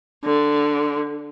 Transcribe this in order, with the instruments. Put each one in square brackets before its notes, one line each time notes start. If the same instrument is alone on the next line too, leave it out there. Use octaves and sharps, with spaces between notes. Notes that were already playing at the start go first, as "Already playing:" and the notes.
[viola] D3